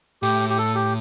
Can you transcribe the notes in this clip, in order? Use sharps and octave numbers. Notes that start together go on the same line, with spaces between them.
A2 G4
G4
A4
G4